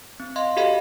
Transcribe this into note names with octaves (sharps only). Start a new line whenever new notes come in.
C4
D#5 F5 C6
F#4 G4 A4 D#5 F5 B5